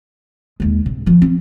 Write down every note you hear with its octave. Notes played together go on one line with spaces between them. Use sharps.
D#2 G#3
C3
F3 F4
C4